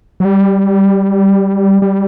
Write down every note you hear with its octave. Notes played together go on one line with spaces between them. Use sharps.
F#3
G3
G3